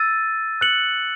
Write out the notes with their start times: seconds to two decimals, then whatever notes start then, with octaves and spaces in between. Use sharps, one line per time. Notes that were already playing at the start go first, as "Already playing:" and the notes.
Already playing: E6 A6 D#7
0.61 F#6 C#7 F#7